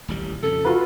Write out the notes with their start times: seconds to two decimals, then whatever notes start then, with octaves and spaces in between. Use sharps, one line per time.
0.08 D#1 A1 G3
0.43 F2 C#3 A4
0.65 F4 F#4 B4